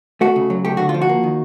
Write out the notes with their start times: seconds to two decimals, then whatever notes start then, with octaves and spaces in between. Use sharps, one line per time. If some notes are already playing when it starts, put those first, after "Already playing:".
0.21 A3 F#4
0.36 C#3
0.50 F#3
0.65 A3 G4
0.77 D3 F#4
0.89 F4
0.94 F3
1.01 F#4
1.09 A#3
1.23 D#3